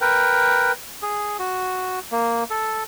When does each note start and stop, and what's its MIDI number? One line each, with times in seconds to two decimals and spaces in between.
0.01 0.72 70
0.01 0.72 71
0.01 0.72 79
1.02 1.37 68
1.39 1.99 66
2.12 2.44 58
2.50 2.83 69